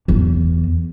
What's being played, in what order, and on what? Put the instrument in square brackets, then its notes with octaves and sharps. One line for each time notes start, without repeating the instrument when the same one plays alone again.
[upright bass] E2